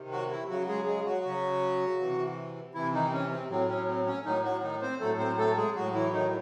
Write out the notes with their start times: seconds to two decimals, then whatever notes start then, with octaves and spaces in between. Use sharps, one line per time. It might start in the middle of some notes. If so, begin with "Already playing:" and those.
Already playing: C3 D#3
0.12 F#3 F#4
0.30 E3 E4
0.49 C#3 F#3 F#4
0.68 G#3 G#4
0.86 G#3 G#4
1.05 F#3 F#4
1.25 C#3 F#3
2.00 C3 E3
2.74 C3 E3 E4
2.93 D#3 D#4
3.07 C4
3.13 C#4
3.31 C4
3.49 A2 F#3 C4
3.68 C#4
3.88 C4
4.06 C#4
4.25 A2 D#3 F#3 D#4
4.44 F#3 F#4
4.62 D#3 D#4
4.81 C4 C5
5.00 A2 F#3 A3 A4
5.19 C4 C5
5.38 A3 A4
5.56 G#3 G#4
5.75 A2 F#3 F#4
5.94 E3 E4
6.13 D#3 D#4